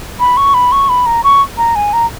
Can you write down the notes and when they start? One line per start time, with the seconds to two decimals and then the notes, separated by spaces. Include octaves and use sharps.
0.20 B5
0.37 C#6
0.54 B5
0.72 C#6
0.89 B5
1.06 A#5
1.24 C#6
1.58 A#5
1.76 G#5
1.93 A#5